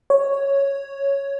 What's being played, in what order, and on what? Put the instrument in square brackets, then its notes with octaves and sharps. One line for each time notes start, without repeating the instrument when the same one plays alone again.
[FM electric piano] C#5